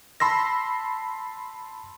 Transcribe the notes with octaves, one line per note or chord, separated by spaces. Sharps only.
A5 B5 C6 E6 A#6